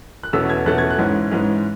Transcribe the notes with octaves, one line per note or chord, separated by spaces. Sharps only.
F#6
E2 B2 A3 C#4 E6
G#6
E2 B2 A3 C#4 F#6
G#6
F#6
G#2 E3 G#3 C#4
G#2 E3 G#3 C#4